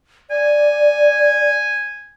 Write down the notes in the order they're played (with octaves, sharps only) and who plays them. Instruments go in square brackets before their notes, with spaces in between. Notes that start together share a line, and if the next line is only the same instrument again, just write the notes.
[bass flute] D5 [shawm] G#5